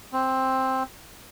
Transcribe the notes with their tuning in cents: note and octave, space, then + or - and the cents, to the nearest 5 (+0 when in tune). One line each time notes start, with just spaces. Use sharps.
C4 +5